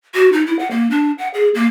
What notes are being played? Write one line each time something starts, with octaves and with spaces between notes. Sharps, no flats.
F#4
D#4
E4
F#5
A#3
D4
F#5
G#4
A#3